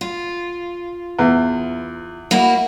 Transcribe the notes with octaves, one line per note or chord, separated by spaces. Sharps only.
F4
E2
A#3 E4 F#4